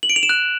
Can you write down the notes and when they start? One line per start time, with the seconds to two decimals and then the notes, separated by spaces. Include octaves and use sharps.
0.03 F#7
0.10 D7
0.16 F7
0.23 E7
0.29 F#6